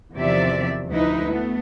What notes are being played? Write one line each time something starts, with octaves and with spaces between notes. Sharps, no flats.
E2 C3 D#3 F3 D5 E5
D2 F3 D#4 E4 B4
A3 B3